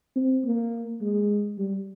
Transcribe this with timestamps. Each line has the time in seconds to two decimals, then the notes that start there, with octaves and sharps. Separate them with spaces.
0.16 C4
0.44 A#3
1.01 G#3
1.58 G3